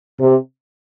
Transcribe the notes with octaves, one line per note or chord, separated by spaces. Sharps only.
C3